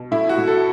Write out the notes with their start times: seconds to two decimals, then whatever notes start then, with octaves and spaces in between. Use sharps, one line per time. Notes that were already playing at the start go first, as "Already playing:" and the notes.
Already playing: B2
0.11 A2 E4
0.29 F#4
0.38 A2
0.47 A4